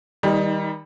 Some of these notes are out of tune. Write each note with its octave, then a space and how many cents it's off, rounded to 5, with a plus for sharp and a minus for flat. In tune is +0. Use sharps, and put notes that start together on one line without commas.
D#3 +30 G3 +15 D#4 +0